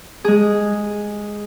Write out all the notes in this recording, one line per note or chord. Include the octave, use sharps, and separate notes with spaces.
G#3 G#4